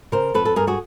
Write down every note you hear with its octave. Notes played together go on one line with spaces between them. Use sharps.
C#3 A#4 C5
F2 A4 B4
A4
G2 G#4 A#4
F#4 G#4